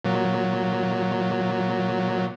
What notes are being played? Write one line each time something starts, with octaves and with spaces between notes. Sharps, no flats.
A#2 F#3